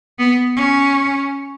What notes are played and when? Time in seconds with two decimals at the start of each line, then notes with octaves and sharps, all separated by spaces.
0.19 B3
0.56 C#4